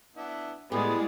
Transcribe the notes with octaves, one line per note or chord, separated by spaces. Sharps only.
B3 D4 E4
A2 G3 G#3 B3 G#4 D5 D#6